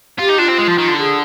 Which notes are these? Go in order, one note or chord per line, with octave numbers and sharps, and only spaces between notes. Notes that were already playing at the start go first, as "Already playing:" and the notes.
F4 G4
D#4
D4 F4
C4
G#3
F3
D#3
D3
G#4